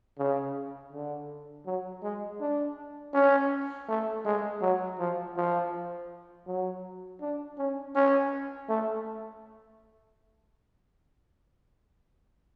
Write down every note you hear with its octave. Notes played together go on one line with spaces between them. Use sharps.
C#3
D3
F#3
G#3
D4
C#4
A3
G#3
F#3
F3
F3
F#3
D4
C#4
C#4
A3